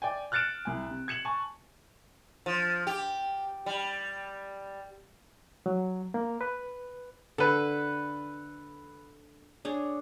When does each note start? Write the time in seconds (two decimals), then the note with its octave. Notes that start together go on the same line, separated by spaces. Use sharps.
0.02 D5 G5 G#5
0.32 F6 F#6 A6 C#7 D7 E7
0.65 C2 G#5
0.90 C3
1.08 G#6 C#7 E7 F#7
1.25 G#5 A5 C#6
2.46 F3
2.87 G4
3.66 G3
5.66 F#3
6.14 A#3
6.41 B4
7.38 D3 A4 B4
9.65 D4 G#4 C#5